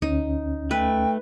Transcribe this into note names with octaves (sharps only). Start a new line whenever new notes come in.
D2 C#4 D#4
A3 B4 G5